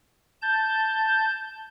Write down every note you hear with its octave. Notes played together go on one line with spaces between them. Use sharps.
A5 G6